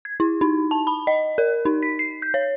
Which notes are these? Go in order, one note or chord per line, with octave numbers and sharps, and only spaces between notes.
G#6
E4
D#4
A5
B5
D#5
A#4
D#4
B6
C7
G6
C#5